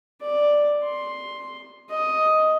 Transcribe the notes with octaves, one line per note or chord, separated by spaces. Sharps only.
D5
C6
D#5